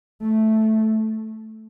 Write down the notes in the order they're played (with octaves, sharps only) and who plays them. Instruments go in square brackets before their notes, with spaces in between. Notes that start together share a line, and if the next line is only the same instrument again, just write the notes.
[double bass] A3